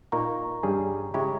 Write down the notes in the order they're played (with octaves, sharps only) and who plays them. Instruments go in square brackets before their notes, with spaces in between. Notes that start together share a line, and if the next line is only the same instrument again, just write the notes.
[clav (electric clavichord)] A#2 A#3 D#4 A#4 [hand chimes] A#5 C#6
[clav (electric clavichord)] G2 G3 C#4 G#4
[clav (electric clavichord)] C#3 G#3 C#4 E4 G4 [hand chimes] A#5 C#6